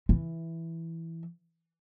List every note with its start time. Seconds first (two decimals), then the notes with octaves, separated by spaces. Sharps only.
0.09 E3